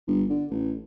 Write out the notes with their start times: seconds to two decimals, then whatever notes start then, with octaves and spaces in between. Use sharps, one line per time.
0.07 G1
0.29 D3
0.51 A1